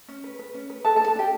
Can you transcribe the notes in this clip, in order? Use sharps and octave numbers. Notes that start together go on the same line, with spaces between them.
C#4
B4
B4
C#4
B4
A4 B4 A5
A4 A5
D4
A4 A5
D4 G4 G5